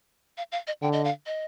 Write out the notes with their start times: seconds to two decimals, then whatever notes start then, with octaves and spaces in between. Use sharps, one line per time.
0.38 F5
0.52 F5
0.67 D#5
0.82 D3 G5
0.93 D#5
1.04 F5
1.26 D#5